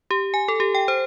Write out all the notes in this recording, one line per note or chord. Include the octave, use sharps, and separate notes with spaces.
G4
G#5
A4
G4
G5
C5